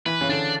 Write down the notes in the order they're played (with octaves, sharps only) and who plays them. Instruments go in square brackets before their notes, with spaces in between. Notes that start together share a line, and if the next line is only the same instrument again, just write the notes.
[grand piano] E3 [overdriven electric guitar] B4
[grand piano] C#3
[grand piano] D3 [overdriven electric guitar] D4